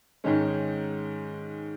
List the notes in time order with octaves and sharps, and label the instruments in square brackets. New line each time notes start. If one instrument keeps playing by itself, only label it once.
[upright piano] G#2 D#3 G#3 C#4